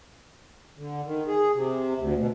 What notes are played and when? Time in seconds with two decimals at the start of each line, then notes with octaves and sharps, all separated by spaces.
0.78 D3
1.06 D#3
1.27 G#4
1.55 C3
2.00 D2
2.18 B2